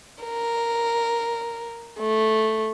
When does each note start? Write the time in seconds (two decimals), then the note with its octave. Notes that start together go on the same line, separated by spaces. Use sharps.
0.24 A#4
2.00 A3